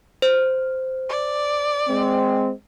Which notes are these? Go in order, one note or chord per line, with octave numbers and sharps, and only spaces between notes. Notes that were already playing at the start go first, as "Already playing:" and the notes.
C5
D5
G#3 C4